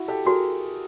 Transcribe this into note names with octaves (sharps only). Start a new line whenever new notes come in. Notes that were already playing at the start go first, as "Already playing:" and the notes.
Already playing: E4 F#4
G4 A4
F#4 G#4 A#4